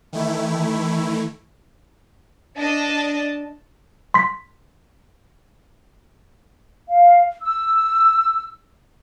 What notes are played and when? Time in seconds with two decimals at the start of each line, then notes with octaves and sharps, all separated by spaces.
0.13 D#3 E3 A3 E4
2.58 D4 D#5 A5
4.14 C6 B6
6.87 F5
7.42 E6